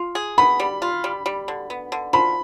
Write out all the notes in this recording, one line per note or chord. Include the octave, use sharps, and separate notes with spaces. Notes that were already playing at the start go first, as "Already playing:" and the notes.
Already playing: F4
G#4
B3 B5
G3
F4
G3
G3
D3
B3
D3
F3 B5